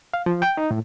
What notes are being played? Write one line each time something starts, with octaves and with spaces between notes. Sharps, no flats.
F5
F3
G5
D#4
A2